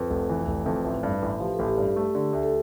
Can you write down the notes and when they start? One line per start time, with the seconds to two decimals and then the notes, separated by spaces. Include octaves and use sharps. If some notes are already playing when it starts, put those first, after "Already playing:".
Already playing: F2 B4
0.10 F1
0.29 E3
0.48 F1
0.66 F2
0.85 A1
1.03 G2
1.22 A1
1.40 F3 G4
1.54 A4
1.59 A1
1.68 G4
1.78 G2
1.96 A3
2.15 D3
2.33 D2
2.43 A4